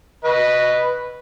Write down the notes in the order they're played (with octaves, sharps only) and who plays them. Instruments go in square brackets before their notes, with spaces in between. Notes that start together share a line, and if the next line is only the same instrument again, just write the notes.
[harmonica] B4 D#5